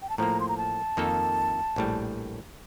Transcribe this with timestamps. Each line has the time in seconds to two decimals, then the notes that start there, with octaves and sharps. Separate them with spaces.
0.02 G5
0.10 A5
0.18 A2 F3 A#3 A#5
0.40 C6
0.48 A#5
0.58 A5
0.97 F2 D#3 A#3 D#4 A4
1.76 A#1 A2 G3